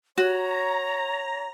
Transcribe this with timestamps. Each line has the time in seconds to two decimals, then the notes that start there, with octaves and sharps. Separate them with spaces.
0.18 F#4 C#5 A#5